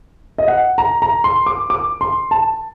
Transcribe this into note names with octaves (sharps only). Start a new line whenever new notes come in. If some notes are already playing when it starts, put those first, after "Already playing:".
D#5
F#5
A#5
A#5
C6
D6
D6
C6
A5